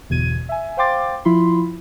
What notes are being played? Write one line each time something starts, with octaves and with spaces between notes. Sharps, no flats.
G1 E2 B2 G#6 D#7
E5 G#5
C5 F5 G5 C6 D6 A6
F3 E4 F4 B5 C6